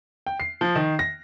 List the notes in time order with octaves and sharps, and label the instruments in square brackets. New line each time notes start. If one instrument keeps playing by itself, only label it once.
[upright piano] G5
C7
F3
D#3
A#6